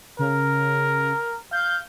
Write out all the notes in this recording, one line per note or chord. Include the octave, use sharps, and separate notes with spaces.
C#3 A#4
F5 G6